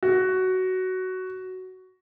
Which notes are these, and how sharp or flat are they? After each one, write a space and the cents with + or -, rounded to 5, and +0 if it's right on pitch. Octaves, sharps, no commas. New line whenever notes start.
F#4 +10